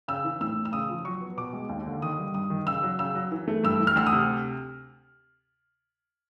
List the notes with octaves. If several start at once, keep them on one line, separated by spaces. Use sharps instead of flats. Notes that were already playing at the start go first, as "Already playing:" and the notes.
C#3 E6
E3
A2 E6
E3
E6
C#3 D#6
F3
F#3 C#6
B3
B2 D6
G#3
D#2
D3
D#3 D#6
G3
G2 D#6
D#3
C#3 E6
F#3
C#3 E6
F#3
E3
A3
G2 E6
E3
F6
D2 E6
D#6
C3